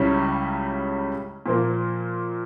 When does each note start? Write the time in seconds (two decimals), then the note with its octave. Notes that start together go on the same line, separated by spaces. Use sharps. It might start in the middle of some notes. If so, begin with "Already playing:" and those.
Already playing: C#2 C#3 G3 C#4 E4
1.46 A#2 F3 A#3